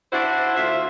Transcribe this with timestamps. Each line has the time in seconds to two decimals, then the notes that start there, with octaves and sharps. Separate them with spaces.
0.12 D4 E4 F#4 C5
0.56 D2 F4 E5